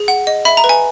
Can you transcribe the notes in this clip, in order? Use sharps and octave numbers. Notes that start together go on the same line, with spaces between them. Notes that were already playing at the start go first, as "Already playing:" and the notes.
Already playing: G#4
F#5
D#5
E5 B5
A#5
B4
G#5